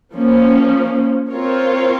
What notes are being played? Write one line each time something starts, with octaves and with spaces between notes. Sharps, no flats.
F3 A#3 C#4
C4 F4 A#4 C#5